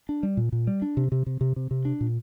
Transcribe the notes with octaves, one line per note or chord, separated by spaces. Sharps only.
D4
G3
A#2
A#2
G3
D4
C3
C3
C3
C3
C3
C3
D4
A#2